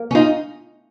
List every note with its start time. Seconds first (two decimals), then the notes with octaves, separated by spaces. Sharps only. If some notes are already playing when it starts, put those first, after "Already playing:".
Already playing: A#3
0.11 C#4
0.15 D#4 F4